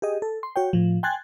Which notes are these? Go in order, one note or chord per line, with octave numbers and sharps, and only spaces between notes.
G4 G#4 D#5
A4
C6
F#4 C#5 G5
A2 F3
G5 G#5 C6 F#6 G#6 A6